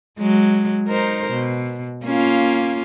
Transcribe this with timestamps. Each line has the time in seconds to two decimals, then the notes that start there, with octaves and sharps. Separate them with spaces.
0.19 F#3 G#3
0.87 D#4 A#4 C5
1.31 B2
2.05 A#3 C#4 F4